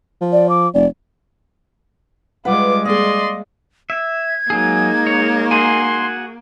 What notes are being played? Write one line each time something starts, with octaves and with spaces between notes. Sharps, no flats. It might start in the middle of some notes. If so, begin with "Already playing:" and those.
F3
D5
D6
F1 D5
G3 G#3 F4 B4 F#5 D6
A#3 G#4 D5 D#5 C6
E5 G#6
F#3 G#3 A#3 D#4 G#4
C#5
F#4 G#4 G#5 C6